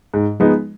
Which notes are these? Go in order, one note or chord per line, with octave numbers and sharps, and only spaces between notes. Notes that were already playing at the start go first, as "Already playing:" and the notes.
G#2
F3 G#3 B3 D#4